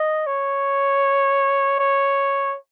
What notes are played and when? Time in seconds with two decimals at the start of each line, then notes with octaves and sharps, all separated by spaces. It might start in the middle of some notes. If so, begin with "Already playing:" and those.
Already playing: D#5
0.26 C#5
1.79 C#5